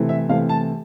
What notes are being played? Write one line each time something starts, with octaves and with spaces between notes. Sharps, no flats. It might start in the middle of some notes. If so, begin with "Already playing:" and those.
Already playing: C3 E3 A3
E5
C3 E3 A3 F5
A5